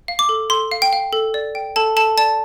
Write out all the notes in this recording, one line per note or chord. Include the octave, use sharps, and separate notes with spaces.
F5
D6
A4
A4 C6
F5
G5
F5
A4
D5
G5
A4 A5
A4 A5
D5 A5